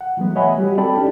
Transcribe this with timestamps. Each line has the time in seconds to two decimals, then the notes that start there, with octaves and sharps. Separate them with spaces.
0.01 F#5
0.17 E3 F#3 G#3 A3 B3
0.36 C#5 D#5 E5 F#5 G#5 B5
0.58 G3 F#4 G4
0.78 C4 A4 D5 G5 A5 B5
0.97 C#4 D4 E4 G4